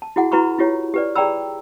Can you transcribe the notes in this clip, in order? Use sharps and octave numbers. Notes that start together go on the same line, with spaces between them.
A5
E4 F#4 G#4 F#5
E4 F#4 B4 A#5 B5 C#6
E4 F4 G4 C#5
G4 B4 D5
G#4 D5 G5 A#5 B5 E6